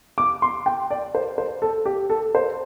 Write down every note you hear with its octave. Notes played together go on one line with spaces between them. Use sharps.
D6
C6
G5
D5
C5
C5
A4
G4
A4
C5